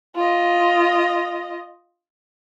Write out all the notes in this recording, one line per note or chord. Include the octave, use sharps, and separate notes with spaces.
F4 D#5